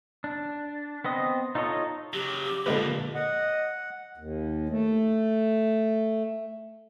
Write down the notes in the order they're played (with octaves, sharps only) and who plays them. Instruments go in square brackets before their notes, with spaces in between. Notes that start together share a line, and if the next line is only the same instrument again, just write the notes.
[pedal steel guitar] D4
B3 C4 D#5
D#4 F4 A4 C#5 D#5
[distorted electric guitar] C#3 F#3 [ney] G4
[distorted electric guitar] F2 [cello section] A#2 [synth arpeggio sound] D3 G#3 B4
[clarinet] D#5 [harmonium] F#5
[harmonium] D#2
A3